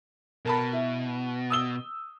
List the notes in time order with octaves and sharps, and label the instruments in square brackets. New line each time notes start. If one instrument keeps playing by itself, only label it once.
[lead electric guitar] B2 [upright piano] A#4 A5 B5
[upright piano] E4
D#6 E6 G7